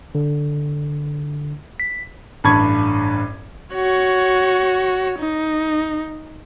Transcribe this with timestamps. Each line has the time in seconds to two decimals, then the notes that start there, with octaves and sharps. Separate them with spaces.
0.15 D3
1.80 B6
2.44 A1 G2 A5 B5 C#6 G#6
3.74 F#4 C#5
5.19 D#4